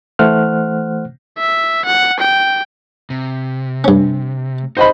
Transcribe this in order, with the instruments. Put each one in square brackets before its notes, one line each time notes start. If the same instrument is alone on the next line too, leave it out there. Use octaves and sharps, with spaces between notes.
[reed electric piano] E3 A3 C5 F#5 F6 F#6
[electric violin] E5
F#5
G5
[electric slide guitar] C3
[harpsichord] G2 C#4
[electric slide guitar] D#4 G4 B4 [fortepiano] C5 D#5 B5